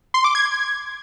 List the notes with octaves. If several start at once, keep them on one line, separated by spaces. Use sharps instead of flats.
C6
D6
G#6